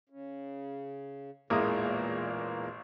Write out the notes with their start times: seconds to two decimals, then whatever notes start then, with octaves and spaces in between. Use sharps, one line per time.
0.09 C#3
1.50 A1 E2 A#2 G#3 A#3 D#6